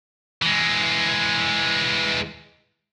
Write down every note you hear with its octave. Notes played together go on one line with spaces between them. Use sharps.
E3 G#3